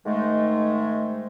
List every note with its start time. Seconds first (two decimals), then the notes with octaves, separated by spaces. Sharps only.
0.06 G#2 D#3 G#3 A3